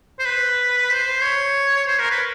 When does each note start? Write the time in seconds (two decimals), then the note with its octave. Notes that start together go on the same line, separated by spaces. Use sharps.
0.19 C5
0.26 B4
0.90 C5
1.22 C#5
1.87 C5
1.99 A#4
2.10 B4